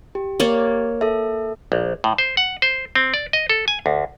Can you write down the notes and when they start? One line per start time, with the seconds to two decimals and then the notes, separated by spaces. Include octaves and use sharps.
0.15 G4
0.40 A#3 C#5 D5
1.01 A4 E5
1.72 A#1
2.04 A2
2.18 C5
2.37 F#5
2.62 C5
2.95 C4
3.14 D5
3.33 D#5
3.50 A4
3.68 G#5
3.86 D2